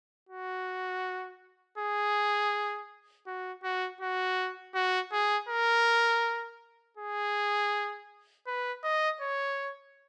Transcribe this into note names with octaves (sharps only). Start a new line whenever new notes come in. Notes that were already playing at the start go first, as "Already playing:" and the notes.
F#4
G#4
F#4
F#4
F#4
F#4
G#4
A#4
G#4
B4
D#5
C#5